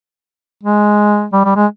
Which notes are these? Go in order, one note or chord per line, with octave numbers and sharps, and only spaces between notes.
G#3
G3
G3
G#3